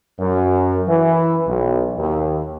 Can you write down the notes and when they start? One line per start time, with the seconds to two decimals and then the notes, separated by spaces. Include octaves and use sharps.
0.19 F#2
0.86 E3
1.46 B1
1.97 D#2